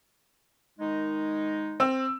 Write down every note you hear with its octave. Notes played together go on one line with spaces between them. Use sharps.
D#3 G#3 D#4
C4 E6